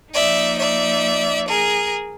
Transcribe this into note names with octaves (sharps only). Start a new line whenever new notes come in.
F3 A#3 D#4 D5 E5
D5 E5
G#4 A#4